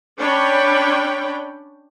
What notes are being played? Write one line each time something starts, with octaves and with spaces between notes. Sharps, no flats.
C#4 D4 C#5 D5 G5 B5